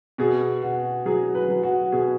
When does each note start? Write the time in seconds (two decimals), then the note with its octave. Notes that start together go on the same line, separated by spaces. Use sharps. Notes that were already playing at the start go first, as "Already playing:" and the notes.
0.18 B2 G#4
0.62 B2 F#4
1.06 F#3 G#4
1.35 B4
1.49 F#3
1.63 F#4
1.92 B2 G#4